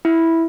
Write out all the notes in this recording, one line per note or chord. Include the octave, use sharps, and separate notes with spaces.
E4